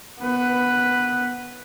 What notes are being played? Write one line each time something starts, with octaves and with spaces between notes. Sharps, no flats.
B3 B4